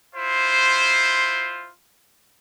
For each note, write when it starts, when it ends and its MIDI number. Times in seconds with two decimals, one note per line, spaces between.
0.15 1.71 64
0.15 1.71 65
0.15 1.71 72